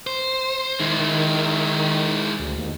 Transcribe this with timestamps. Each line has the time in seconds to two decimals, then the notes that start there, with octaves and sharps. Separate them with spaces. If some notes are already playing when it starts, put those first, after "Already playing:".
0.07 C5
0.80 D#3 G#3 E4
2.39 D2
2.58 D#2